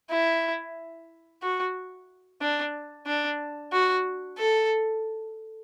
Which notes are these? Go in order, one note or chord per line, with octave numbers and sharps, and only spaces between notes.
E4
F#4
D4
D4
F#4
A4